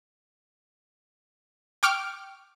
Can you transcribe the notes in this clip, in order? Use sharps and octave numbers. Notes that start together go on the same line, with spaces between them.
G5 C#6 D6 F6 D7